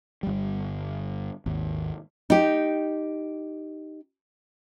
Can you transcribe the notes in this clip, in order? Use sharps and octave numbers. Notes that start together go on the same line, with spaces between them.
G1 G3
G#1 D#2
D#4 G4